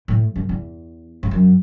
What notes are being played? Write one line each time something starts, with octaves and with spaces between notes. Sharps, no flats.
A2
F#2
E2
G#2
F#2